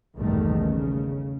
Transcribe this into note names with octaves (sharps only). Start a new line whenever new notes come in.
A#1 E2 G2 B2 D#3 A3
C#3